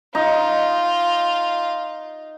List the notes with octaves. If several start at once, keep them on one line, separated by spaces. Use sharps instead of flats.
D#4 F4